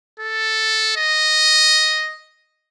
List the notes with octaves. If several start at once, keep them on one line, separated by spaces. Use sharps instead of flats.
A4
D#5